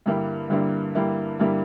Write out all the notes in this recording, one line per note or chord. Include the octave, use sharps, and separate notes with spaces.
G2 D3 G3 A#3 E4
G2 D3 G3 A#3 E4
G2 D3 G3 A#3 E4
G2 D3 G3 A#3 E4